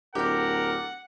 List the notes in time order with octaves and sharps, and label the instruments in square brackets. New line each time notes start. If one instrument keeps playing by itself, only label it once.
[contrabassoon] D1 [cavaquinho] G4 D5 [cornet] A#4 [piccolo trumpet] F#5